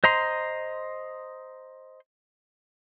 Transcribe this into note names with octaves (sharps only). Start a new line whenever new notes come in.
C5 D#5 A#5 C6